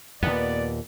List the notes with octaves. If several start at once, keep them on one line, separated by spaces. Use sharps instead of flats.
D#2 A#2 B3 D5